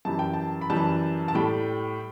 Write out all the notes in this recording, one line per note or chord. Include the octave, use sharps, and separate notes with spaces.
F#2 E3 G3 A5
G5
A5
B5
F#2 E3 G3 A5
A5
A2 G3 G5